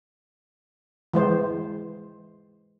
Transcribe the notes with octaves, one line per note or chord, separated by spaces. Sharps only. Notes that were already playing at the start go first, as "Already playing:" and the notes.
E3 G#3 C5